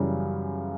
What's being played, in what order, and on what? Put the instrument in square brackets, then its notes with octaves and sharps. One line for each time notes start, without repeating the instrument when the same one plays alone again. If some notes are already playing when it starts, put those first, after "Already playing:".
Already playing: [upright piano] F#2 C#3 E3 G3